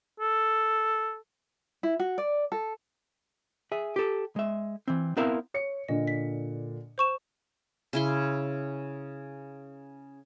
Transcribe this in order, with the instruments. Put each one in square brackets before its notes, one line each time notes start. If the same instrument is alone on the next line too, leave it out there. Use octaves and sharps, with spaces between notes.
[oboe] A4
[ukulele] E4
F#4
D5
A4
[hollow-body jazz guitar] G#4 E5
G4 A4
G#3 E5
E3 C4
B3 C4 E4 A#4 E5 F5
[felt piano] C#5 C#7
[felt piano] A#2 D3 [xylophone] D#5
[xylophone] B6
C5 C#6 E7
[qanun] C#3 E4 C6